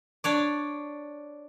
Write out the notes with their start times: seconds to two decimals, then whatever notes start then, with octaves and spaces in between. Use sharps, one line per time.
0.24 D4 C#5 D5